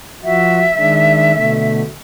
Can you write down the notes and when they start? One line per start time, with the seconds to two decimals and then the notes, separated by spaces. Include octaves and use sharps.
0.24 F3 F#4 E5
0.77 D#3 G#3 D4
1.34 B2 D3 A3